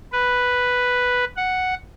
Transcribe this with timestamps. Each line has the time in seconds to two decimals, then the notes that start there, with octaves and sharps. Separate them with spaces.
0.12 B4
1.37 F#5